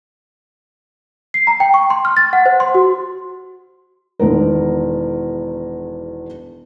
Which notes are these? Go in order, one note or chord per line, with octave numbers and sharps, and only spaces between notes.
C7
A#5
G5
C#6
C6
F6
A6
F#5
C5
C6
F#4
E1 E2 D#3 A#4